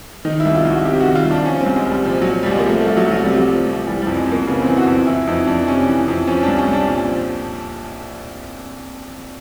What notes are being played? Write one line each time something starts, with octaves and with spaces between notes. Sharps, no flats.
D#3 D#4
E4
C2
F4
C2
F#4
C3 G4
D#3 F#4
F4
C2
D4
F3 C#4
C4
C2
G#3
C2 G3
A#2 F3
F3 F#3
C2 G3
G#3
A#3
F3 A3
A3
C2
F#3
C2
F#3
C3 G3
F#3
F3
C2
E3 G3
F2 G3
G#3
F2
A#3
C#3 B3
C4
E3
F#4
F2
E3 E4
F2 D#4
F2 D4
C3 C#4
E3
F2
F3 C#4
C2 D4
C#4
C2 D4
A#2
F3